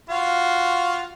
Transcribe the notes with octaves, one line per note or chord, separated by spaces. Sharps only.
F4 F#4